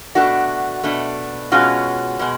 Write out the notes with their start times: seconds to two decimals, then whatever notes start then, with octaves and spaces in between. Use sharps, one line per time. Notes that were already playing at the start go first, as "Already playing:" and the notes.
0.15 B2 A3 D4 F#4
0.83 B2 A3 D4
1.52 B2 G#3 C#4 F4 F#4
2.19 B2 G#3